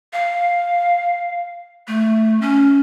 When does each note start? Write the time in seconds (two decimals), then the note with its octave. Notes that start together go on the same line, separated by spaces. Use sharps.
0.13 F5
1.88 A3
2.42 C#4